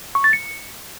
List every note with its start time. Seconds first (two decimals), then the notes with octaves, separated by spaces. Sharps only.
0.15 C#6
0.24 A6
0.33 C#7